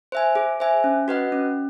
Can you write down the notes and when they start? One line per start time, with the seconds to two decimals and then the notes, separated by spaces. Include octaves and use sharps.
0.12 C5 E5 G#5
0.35 G#4
0.60 C5 E5 G#5
0.84 C#4
1.08 F#4 B4 D#5 F#5
1.32 C#4